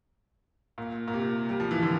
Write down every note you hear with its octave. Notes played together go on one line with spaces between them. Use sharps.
A#2
A#2
C3
G3
F3
E3
D3 F3